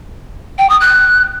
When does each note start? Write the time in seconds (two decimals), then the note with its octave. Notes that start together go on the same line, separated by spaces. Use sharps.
0.58 G5
0.69 D#6
0.80 F#6